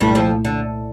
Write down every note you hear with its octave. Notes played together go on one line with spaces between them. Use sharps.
C2 G2 A#2 G3 A3 E4
F2 F3
D3